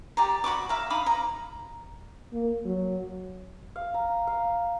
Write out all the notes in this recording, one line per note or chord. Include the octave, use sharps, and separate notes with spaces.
G4 D5 A#5
F#4 B5 C#6 D6
E5 F5 A#5
D#4 F5 B5 D6
A#5
A#3
F#3
F5
A#5
F5